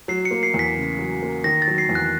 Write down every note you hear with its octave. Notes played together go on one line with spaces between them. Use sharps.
F#3 C7
C#7
A#3
C7
E2
B6
C#3
F#3
A#3
D#3 A#6
A6
F#3
C7
E2
F#6